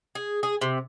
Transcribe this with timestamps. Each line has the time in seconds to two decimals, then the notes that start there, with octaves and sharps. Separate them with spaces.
0.15 G#4
0.43 G#4
0.61 C3